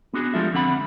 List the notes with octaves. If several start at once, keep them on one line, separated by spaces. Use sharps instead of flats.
B3 D4 F#4 G#4
F3 G3 G#3 F4 A4 E5
F2 D3 C4 F#5 B5